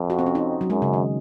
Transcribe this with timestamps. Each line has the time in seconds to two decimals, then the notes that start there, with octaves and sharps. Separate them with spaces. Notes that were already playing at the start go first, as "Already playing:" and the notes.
Already playing: F2
0.10 F#4
0.19 C4
0.26 C#4
0.35 D#4
0.61 F#3
0.70 F#2 G#3
0.82 C#3
0.94 D#3